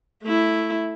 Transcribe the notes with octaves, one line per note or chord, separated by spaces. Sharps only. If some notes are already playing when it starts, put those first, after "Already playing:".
A3 E4